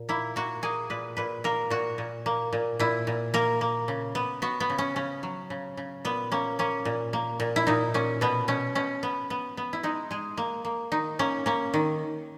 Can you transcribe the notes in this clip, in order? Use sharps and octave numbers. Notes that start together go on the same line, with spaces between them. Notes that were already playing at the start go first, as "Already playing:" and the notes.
Already playing: A#2
A#3 E4
A#3 F#4
A#3 G#4
A#2 B4
A#2 B4
A#3 A#4
A#2 F#4
A#2
A#3
A#2
A#2 E4
A#2
A#3 A#4
A#3
C#3
B3
B3 F#4
B3
C#3
C#4
C#3 C#4
F#3
C#3
C#3
A#2 B3
A#3 C#4
A#3 C#4
A#2
A#3
A#2
E4
A#2 D#4
A#2 C#4
B2 B3
B2 C#4
B2 C#4
B3
B3
B3
E4
G#3 D#4
G#3 G#4
A#3
A#3
D#3 D#4
A#3 C#4
A#3 C#4
D#3